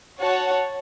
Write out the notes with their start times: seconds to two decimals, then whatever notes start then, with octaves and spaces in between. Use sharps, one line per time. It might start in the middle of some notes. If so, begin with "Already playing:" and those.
0.20 F#4 C#5 F#5 A5